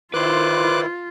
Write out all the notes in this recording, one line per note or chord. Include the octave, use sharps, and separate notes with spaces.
D#3 E4 F4 B4 C5 D6 F#6